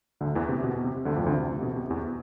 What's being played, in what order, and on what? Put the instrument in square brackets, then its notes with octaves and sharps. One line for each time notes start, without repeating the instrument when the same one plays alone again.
[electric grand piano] D2 D3
E2 E3
C3
B2
C3
D2 D3
F2 F3
E3
D2 D3
C3
C3
B2
C3
E2 E3